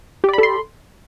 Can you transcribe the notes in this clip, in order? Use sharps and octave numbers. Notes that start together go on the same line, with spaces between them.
G4 A4 D5 B5 C6